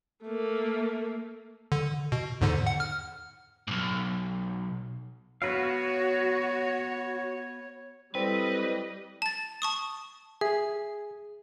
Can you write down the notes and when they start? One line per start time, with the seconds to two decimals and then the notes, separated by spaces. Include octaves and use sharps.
0.24 A3 A#3
1.72 D3
2.12 B2
2.41 E2 G#2 D3
2.67 F#5
2.80 F6
3.68 B1 G#2
5.42 B3 F#4 B4 C#5 F5
8.15 G3 C4 E4 A4 B4 D5 D#5
9.22 A5 A6
9.62 A5 C#6 D#6
10.41 G#4 E5